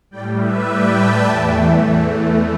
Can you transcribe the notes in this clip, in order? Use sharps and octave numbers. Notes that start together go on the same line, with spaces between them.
A2 G3 D5 G5
B4 E5
D5 G5
E5 A5
E2 E3 A3